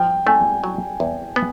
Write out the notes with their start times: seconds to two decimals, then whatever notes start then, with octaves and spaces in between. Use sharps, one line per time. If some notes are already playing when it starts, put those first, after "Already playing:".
Already playing: F3 G5
0.26 A3 G#5
0.64 F#3
1.00 E2
1.36 B3